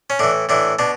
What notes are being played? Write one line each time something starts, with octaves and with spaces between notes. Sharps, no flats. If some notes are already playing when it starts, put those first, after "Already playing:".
C#4
A2 E3 D4
A2 E3 D4
B2 D4